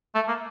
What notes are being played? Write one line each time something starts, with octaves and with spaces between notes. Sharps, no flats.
A3
A#3